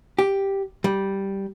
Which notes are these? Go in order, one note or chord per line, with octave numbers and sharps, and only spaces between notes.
G4
G3